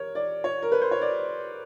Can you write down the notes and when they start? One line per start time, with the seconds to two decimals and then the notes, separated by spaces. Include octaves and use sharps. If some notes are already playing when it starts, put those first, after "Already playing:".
Already playing: A#4 C#5
0.15 D5
0.44 C#5
0.62 A#4
0.72 B4
0.82 C5
0.91 C#5
1.01 D5